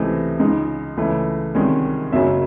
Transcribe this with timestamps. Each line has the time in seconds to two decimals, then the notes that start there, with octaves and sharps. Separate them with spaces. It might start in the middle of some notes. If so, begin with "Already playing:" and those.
Already playing: C#2 C3 E3 A3 C4 D#5
0.39 C#2 C#3 G#3 D#4
0.97 C#2 C#3 E3 A3
1.55 C2 C3 D#3 G#3 C#4
2.12 F#1 F#2 C#3 F#3 E5